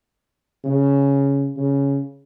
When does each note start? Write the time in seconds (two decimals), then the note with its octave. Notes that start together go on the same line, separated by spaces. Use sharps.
0.64 C#3
1.57 C#3